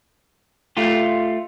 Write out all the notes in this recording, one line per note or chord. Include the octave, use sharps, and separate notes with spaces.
A3 F4 G4